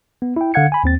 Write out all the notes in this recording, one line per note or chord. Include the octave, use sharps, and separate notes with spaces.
B3
E4 G5
D3 F5 F#5 G#6 C#7
G#5 B5
D#2 C4 A6